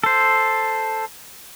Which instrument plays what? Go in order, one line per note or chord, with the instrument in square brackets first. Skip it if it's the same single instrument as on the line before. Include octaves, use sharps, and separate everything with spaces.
[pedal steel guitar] A4 C5